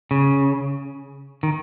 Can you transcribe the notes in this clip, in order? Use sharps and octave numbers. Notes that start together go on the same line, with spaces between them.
C#3
D#3